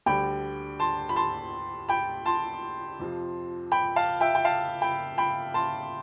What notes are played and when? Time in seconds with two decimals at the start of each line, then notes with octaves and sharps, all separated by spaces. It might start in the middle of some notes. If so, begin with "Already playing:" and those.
0.06 D2 D3 G3 G5 B5
0.80 A5 C6
1.09 B5
1.16 A5 C6
1.89 G5 B5
2.26 A5 C6
2.99 F2 C3 F3
3.72 G5 B5
3.96 F5 A5
4.20 E5 G5
4.35 G5
4.45 F5 A5
4.82 G5 B5
5.18 G5 B5
5.54 A5 C6